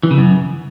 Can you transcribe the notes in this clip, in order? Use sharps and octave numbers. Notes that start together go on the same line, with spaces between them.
E3
C#3
F#2